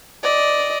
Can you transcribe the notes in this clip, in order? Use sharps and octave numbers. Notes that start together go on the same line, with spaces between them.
D5 D#5